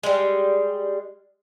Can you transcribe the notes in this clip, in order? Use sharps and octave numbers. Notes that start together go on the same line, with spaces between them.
G3 G#3